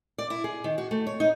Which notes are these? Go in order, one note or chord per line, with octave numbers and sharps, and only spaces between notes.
D5
E4
G#4
D#3
F#4
A3
C#5
D#4